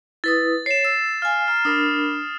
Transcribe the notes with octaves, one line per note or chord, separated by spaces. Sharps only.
E4 B4 D#6 A6
C#5 C7 E7
E6
F5 G#5 F6
A#5 F6
D4 A#4 B5 D#6